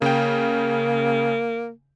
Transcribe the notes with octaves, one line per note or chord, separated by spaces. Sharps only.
C#3 A#3 G5